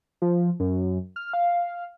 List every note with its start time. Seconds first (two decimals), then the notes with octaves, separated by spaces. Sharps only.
0.22 F3
0.60 F#2
1.16 F6
1.33 F5